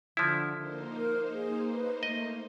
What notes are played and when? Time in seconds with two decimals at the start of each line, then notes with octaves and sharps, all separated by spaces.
0.17 D3 F3 E4
0.57 D3 A#3 D#4 C5
0.96 A#4
1.32 G#4
1.73 B4
2.03 A3 D#5